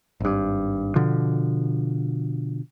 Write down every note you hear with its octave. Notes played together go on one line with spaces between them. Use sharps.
G#1 G2
B2 D3 F3